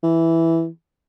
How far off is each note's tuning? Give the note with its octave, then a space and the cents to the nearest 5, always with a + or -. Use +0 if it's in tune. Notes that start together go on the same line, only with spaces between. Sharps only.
E3 +0